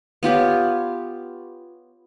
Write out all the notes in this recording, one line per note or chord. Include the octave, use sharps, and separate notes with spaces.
B3 F4 G4 C#5